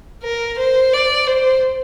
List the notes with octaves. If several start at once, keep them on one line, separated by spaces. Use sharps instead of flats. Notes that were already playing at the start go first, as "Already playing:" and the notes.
A#4
C5
D5
C5